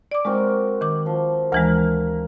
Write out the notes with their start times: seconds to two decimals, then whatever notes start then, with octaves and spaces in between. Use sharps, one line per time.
0.11 D5 D6
0.25 G#3 C4 F#4 A#4
0.81 D#3 D6
1.06 F3
1.52 D2 E3 G#3 A#4